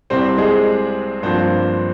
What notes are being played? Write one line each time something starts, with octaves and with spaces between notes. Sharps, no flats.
C2 C3 G3 C4 C5
G#3 G#4
G2 F3 A#3 C4 C5